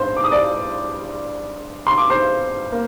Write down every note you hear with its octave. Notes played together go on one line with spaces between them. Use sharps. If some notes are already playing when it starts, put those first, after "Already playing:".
Already playing: A1 G2 C5 C6
D6
D#6
D5 D6
C6
D6
C5 C6
A#3